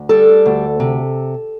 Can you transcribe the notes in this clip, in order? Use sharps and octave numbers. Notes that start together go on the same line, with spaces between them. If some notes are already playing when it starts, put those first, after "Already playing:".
Already playing: D2
G3 A4
D2
C3